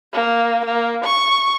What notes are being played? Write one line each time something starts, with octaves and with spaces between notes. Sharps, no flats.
A#3
A#3
C#6